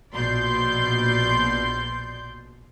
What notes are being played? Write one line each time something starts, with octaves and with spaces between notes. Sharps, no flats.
A#1 B2 D5 C6 G6